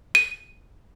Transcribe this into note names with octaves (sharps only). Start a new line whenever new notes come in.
D#7